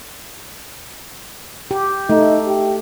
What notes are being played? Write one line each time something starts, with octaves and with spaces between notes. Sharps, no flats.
G4
A3 D#4
G4